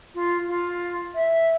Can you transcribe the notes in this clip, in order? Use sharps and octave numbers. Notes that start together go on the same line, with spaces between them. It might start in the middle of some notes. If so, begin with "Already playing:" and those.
F4
F4
E5